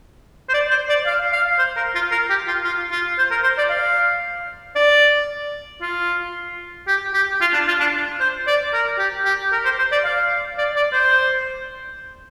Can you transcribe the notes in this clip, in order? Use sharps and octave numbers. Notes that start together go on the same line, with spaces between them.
C5
D5
C5
D5
F5
F5
C5
A#4
F4
A#4
G4
F4
F4
F4
C5
A#4
C5
D5
F5
D5
F4
G4
G4
F4
D4
F4
D4
C5
D5
A#4
G4
G4
A#4
C5
C5
D5
F5
D5
D5
C5